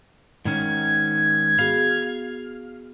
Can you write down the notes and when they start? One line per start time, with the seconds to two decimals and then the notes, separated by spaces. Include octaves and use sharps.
0.45 G#2 D#3 C#4 G#6
1.59 B3 F#4 G#4 F5